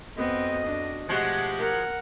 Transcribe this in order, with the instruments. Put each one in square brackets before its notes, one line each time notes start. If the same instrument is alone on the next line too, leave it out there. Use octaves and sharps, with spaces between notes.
[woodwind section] F2 F#4 D#5 [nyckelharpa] B3 C4
[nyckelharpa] D4
[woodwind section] B2 A3 G4 [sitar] F3 G#3 F#4 [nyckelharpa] F#5
[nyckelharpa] A#4 F#5